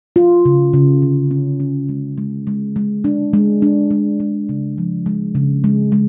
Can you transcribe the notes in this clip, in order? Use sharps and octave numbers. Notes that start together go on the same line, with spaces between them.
F4
C#3
C#3
D3
C#4
C#4
G#3
G#3
G#3
G#3
D4
G#3
D4
G#3
G#3
C#3
F3
G#3
C#3
G#3
G#3